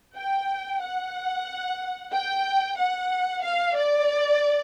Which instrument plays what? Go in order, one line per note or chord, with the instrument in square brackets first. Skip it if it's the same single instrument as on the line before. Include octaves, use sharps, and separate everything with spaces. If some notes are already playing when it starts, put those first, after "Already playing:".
[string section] G5
F#5
G5
F#5
F5
D5